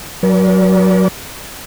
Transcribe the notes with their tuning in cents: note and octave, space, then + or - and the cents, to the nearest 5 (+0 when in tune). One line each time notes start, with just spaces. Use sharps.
F#3 +0 A#4 +45 D5 -35